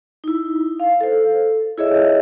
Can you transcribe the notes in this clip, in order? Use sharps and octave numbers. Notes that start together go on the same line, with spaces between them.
D#4 E4
F5
A4 C5
E4 G#4 C#5 D#5 E5